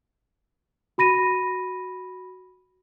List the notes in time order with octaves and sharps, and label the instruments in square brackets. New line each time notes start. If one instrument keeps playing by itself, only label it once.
[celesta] F#4 B5 A#6 D#7